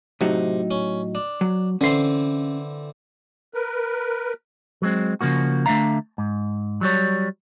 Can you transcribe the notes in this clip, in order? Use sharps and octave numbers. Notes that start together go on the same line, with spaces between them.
A2 C3 F#3 D#4
C#4
D4
F#3
D3 E3 C4 C#4 C6
A#4 B4
F#3 G#3 C4
C#3 F3 A#3 F#4
D3 A3 D4 E5 F5 A#5
G#2
F#3 G3 C#5